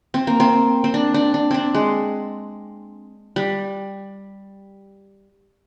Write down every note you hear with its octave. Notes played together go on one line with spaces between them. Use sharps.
C4
A#3
C4
C4
D4
D4
D4
C4 D4
G#3
G3